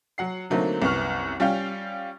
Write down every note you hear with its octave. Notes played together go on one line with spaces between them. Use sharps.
F#3 F#5 C7
D3 F#3 A3 A#3 C4 D#4
C2 F#2 B3 C#6 F6
G3 C#4 F4 F5 G5